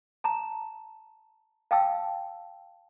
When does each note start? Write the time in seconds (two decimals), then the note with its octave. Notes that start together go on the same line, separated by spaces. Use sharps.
0.24 A5 A#5
1.71 F5 G5 A5 E6